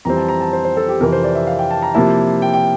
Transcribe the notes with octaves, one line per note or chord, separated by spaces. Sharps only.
F2 E3 G3 C4 A#5
A5
A#5
A5
C5
C5
A4
G4
F2 C3 E3 A#4
C5
D5
E5
F5
G5
A5
A#5
C3 F3 A#3 E4 A5
G5
G5